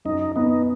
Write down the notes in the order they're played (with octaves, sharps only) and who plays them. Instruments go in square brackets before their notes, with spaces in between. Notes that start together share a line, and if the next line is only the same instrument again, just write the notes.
[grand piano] F#2 [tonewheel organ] D#4
[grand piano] B3 [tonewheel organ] D#4